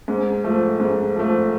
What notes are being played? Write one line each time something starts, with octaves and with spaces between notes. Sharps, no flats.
G#2
F3 A3
G#2
F3 A3